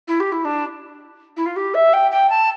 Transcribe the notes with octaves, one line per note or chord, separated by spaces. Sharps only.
E4
G4
E4
D4
E4
F4
G4
E5
G5
G5
A5